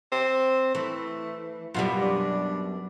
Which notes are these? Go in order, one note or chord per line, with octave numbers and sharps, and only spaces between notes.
C4
E3 A3
F#2 B2 G3 F4
D4